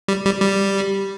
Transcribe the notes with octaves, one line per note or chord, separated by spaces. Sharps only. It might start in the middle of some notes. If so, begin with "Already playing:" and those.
G3
G3
G3